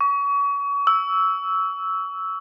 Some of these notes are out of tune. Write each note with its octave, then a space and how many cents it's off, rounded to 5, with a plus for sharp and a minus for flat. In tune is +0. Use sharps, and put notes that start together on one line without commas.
C#6 +35
E6 -5